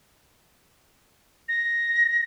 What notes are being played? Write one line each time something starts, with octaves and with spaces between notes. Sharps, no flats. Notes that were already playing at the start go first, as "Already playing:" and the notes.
A#6